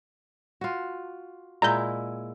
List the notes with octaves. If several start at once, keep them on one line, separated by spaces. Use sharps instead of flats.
F4 F#4
A#2 G#3 E4 A#5 G6